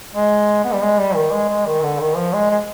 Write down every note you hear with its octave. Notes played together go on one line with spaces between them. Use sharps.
G#3
B3
G3
G#3
G3
D#3
G#3
G#3
D#3
D3
D#3
F3
G#3
G#3